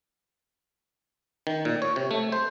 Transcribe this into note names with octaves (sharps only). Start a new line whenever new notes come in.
D#3
A#2
C#5
C3
A3
C5